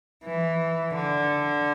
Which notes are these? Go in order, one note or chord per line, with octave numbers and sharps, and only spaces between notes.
E3
D3